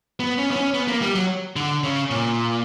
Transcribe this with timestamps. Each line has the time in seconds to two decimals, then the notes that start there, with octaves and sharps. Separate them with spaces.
0.20 B3
0.38 C#4
0.51 B3
0.56 C#4
0.74 B3
0.88 A#3
1.02 G3
1.15 F#3
1.56 D3
1.84 C#3
2.11 A#2